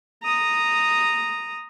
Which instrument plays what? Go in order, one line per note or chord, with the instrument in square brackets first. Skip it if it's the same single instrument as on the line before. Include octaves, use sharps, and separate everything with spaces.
[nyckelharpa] A#5 D#6